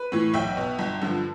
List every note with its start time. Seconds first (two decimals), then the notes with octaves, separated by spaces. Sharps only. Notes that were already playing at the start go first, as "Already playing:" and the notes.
Already playing: B4
0.12 A2 E3
0.34 B1 E5 G5
0.57 B2
0.79 G1
1.02 G2 D3 F3